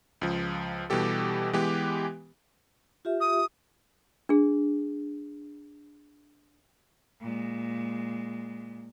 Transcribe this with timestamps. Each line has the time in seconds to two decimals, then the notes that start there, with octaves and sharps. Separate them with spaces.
0.21 C#2 F3
0.90 B2 E3 G3 G4 A4
1.53 E3 G#3 B3 G4 B4
3.05 F4 G4 E5
3.20 D#6
4.29 D4 G#4
7.21 A#2 G#3